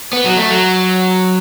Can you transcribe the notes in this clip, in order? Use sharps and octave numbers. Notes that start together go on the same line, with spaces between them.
B3
F#3
A3
F#3